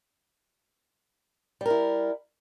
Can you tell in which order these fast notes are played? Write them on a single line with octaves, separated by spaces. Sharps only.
G3 A#4 E4